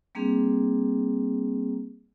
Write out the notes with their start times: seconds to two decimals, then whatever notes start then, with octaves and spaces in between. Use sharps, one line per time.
0.15 G3 A#3 C4 D4 G#4